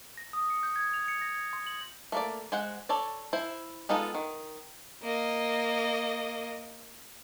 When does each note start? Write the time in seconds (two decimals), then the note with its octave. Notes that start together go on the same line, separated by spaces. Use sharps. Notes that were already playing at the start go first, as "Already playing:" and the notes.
0.17 A#6
0.33 D#6
0.50 C#7
0.63 G6
0.76 G#6
0.94 F7
1.08 C#7
1.22 A#6
1.35 G#6
1.53 C6
1.67 F#7
2.12 A3 A#3 D5
2.52 G#3 C5 F#5
2.89 A4 C#5 D5
3.33 E4 C5
3.89 G#3 B3 D#4 F4 A4
4.15 D#3
5.02 A#3 D#5